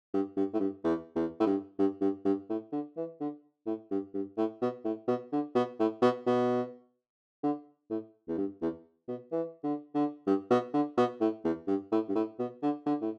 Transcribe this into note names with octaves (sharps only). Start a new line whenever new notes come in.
G2
G2
A2
G2
E2
E2
A2
G2
G2
G2
G2
A2
D3
E3
D3
A2
G2
G2
A2
B2
A2
B2
D3
B2
A2
B2
B2
D3
A2
E2
G2
E2
B2
E3
D3
D3
G2
B2
D3
B2
A2
E2
G2
A2
G2
A2
B2
D3
D3
A2